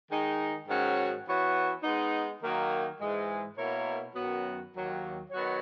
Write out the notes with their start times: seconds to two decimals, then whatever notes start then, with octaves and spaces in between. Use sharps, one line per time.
0.09 D#3 G#3 D#4
0.67 G#2 D#3 F#3 C#4 F#4
1.25 E3 B3 F#4 C#5
1.83 G#3 B3 D#4
2.41 D#3 F#3 A#3 D#4
2.99 G#2 E3 G#3
3.57 B2 A#3 E4 A#4 C#5
4.15 F#2 D#3 F#3 B3 F#4
4.73 D#2 D#3 F#3 A#3
5.31 D#3 F#3 B3 F#4 C#5